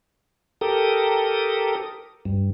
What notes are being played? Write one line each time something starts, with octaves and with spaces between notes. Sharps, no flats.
G4 A4 A#4 D#6
G2